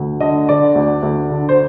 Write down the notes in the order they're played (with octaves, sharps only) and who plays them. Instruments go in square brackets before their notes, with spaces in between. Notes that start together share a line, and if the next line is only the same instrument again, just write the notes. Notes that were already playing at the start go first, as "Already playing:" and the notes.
Already playing: [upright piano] D2
D3 D#5
D3 D5
D2
D2
D3
C5